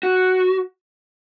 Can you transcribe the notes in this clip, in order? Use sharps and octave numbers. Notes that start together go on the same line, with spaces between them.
F#4